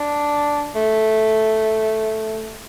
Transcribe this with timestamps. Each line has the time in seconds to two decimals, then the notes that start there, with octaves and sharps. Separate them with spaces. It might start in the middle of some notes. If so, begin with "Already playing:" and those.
Already playing: D4
0.75 A3